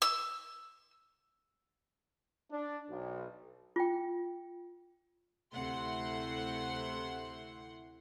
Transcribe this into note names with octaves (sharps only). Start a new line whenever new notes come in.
E6
D4
B1
F4 G5
D2 C3 A3 E4 F#5 C6